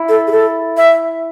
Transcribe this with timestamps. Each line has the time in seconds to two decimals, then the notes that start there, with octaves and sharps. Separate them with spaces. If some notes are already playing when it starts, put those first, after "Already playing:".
Already playing: E4
0.09 A4
0.27 G#4
0.31 A4
0.77 E5